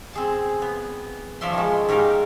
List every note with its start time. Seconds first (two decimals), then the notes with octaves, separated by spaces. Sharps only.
0.13 C4 G#4 A5
0.62 B3
1.41 F3 C#5 D5 E5 C6
1.53 D#3 G#3
1.89 G#2 D#3 G4 A#4 F5